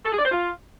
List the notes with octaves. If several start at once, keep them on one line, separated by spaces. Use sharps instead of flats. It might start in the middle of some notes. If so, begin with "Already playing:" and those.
A4
G#4
D5
C5
F4